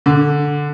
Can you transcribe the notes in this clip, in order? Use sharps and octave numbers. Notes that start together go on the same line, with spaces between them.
D3